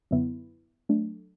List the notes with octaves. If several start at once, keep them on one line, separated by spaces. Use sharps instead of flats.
F#2 D3 F#3 B3 E4
F#3 A3 D4